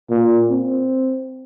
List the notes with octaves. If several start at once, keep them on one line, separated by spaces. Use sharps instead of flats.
A#2
C4